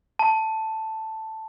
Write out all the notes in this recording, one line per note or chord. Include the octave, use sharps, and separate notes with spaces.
A5